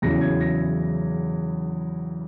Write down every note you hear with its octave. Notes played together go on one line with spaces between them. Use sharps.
E2 C#3 F#3 C#4 E4 A#6
G#6
A#6